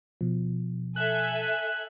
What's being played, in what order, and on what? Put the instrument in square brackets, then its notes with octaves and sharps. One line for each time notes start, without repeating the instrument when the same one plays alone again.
[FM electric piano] B2 F3
[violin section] A4 E5 G#5 [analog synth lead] F#6